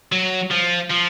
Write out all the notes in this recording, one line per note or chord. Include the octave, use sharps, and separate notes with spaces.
F#3
F3
F3